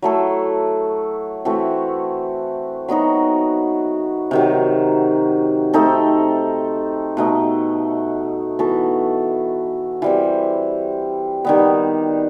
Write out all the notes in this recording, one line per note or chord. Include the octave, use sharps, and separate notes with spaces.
F#3 A3 E4 A4
E3 A3 C4 F#4
F#3 B3 D#4 F#4
C3 D#3 F#3
A3 C4 D#4 A4
B2 A3 D#4
E3 B3 F#4 A4
E3 G3 C4
D#3 G3 B3